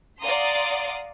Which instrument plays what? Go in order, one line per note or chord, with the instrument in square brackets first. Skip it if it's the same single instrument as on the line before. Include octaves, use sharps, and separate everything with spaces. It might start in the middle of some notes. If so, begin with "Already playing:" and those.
[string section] D5 F5 F#5 A#5 C6 D#6